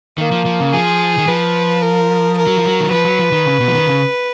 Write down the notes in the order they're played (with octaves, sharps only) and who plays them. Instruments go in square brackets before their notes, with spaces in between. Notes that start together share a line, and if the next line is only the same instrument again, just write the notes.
[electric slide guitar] D#3 [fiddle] A#3
[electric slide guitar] F3
F3
C#3
[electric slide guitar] F3 [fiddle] G#4
[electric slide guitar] D#3
[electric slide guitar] F3 [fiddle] B4
[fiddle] A#4
A#4
[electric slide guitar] F#3
F3
F#3
D#3
[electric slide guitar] F3 [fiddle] B4
[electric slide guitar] F#3
F3
D#3
C#3
B2
F3
D#3
C#3